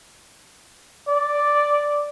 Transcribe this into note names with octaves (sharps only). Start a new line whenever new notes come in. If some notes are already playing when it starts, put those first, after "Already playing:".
D5